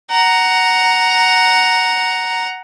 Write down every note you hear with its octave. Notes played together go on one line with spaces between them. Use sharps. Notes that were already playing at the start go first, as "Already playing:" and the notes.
F#5 A#5